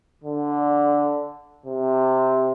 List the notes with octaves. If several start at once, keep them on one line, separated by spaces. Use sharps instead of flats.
D3
C3